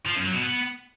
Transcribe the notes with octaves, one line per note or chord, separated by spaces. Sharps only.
F3
F#2
F#3
B2
B3